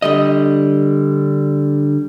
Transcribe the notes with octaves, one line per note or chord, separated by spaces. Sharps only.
D3 G3 D#5